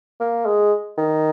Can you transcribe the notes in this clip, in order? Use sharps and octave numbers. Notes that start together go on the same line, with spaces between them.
A#3
G#3
D#3